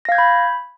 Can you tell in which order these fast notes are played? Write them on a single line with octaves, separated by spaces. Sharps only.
A#6 F5 G#6 G6 B5